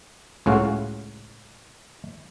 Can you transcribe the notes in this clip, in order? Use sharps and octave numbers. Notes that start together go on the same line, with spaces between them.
C#2 A2 C#3 F#4 F5